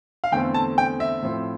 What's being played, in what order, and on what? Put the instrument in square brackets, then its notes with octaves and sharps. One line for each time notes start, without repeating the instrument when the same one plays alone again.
[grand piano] F5
E2 D3 A3 C4 G5
A5
G5
E5
A2 F3 C4